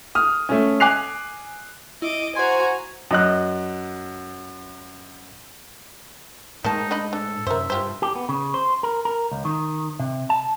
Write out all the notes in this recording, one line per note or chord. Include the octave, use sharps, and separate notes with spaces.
D#6 F6
A3 C#4
G#5 D6 F#6 C7 F7
E4 D#5 D6
F#4 C5 G#5 A#5 C6
F#2 D#5 F#6
A2 D#3 G#3 A#3 D#4 A5
D4 D#5 B5
D4 A4
F#2 C3 A#4 C5 E5
G2 F4 G4 C5
G4
B3
C#3
C5
A#4
A#4
C#2
D#3
C3
A5